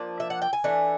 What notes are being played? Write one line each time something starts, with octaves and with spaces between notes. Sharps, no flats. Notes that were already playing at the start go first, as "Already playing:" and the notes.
Already playing: F3 A#3 D4
E5
F#5
G5
G#5
E3 A3 D4